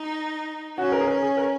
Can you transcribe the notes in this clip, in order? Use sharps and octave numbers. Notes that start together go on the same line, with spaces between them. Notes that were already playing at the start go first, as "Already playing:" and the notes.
Already playing: D#4
C#4 F#4
A#4
G#4
A#4
G#4
A#4